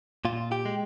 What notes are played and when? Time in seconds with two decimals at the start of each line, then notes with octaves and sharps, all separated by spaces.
0.25 A#2 F4
0.52 G4
0.65 G#3